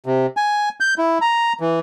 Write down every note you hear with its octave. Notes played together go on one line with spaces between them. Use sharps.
C3
G#5
G6
E4
A#5
E3